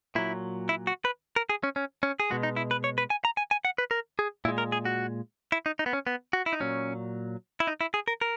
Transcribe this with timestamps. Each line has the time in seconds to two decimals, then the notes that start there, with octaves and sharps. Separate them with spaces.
0.15 A#2 F#3 E4
0.69 E4
0.87 F#4
1.05 B4
1.36 A#4
1.50 G#4
1.63 C#4
1.76 C#4
2.03 C#4
2.20 G#4
2.30 B2 G#3 F#4
2.43 D#4
2.56 E4
2.71 B4
2.84 C#5
2.98 B4
3.10 G#5
3.25 A#5
3.37 G#5
3.51 G#5
3.65 F#5
3.78 B4
3.91 A#4
4.19 G#4
4.45 A#2 E4
4.48 G#3
4.58 A#4
4.72 G#4
4.85 F#4
5.52 E4
5.66 D#4
5.79 D#4
5.86 B3
5.93 C#4
6.07 B3
6.33 F#4
6.46 E4
6.53 D#4
6.60 A#2 F#3 C#4
7.60 E4
7.67 D#4
7.81 E4
7.94 G#4
8.08 A#4
8.21 A#4